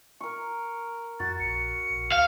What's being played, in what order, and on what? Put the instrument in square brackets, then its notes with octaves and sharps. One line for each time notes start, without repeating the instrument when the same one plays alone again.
[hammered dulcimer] A#4 C#6
[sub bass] F2 [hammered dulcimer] F#4 [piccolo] A6
[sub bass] A#1 [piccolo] C#7
[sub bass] A#1
[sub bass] D2 [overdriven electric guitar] F5